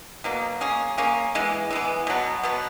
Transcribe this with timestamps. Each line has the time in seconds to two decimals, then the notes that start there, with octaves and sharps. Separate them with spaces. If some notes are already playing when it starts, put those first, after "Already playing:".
0.24 B2 F#3 A#3
0.61 A#3 C#4 G#4
0.98 A#3 C#4 G#4
1.35 E3 G#3 B3
1.71 E3 G#3 B3
2.07 B2 F#3 B3
2.43 B2 F#3 B3